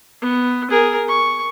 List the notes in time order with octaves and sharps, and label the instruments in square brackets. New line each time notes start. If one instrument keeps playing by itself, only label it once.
[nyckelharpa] B3
G#4 A#4
C#6